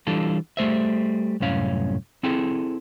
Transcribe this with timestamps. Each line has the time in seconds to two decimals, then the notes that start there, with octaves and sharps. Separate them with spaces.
0.07 E3 G3 D4 F4 A4
0.57 G3 A3 C5 E5
1.40 C2 F#2 A2 C#4 F5
2.23 C4 E4 G#4 A4 G5